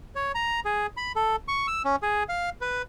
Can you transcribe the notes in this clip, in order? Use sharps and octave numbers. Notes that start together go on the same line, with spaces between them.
C#5
A#5
G#4
B5
A4
C#6
E6
C#4
G#4
F5
B4